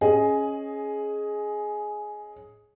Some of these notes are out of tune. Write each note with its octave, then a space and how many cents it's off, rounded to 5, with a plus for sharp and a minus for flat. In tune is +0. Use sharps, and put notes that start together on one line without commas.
C#4 -10 G#4 +10 D#5 +0